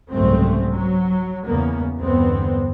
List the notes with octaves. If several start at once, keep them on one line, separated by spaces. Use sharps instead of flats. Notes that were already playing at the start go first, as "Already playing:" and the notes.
F#1 C2 G#2 A3 C4
F#3
E2 C#3 A#3 B3
E2 G2 D3 B3 C4